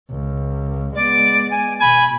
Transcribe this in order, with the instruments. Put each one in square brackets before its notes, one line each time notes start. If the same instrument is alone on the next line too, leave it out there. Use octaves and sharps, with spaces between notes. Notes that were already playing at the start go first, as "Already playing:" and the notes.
[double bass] C#2
[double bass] G#3 B3 [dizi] D5
[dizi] G#5
[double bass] B2 [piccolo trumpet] G#5 [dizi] B5